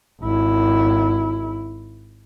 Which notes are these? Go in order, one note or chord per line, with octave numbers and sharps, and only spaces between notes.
G#1 E4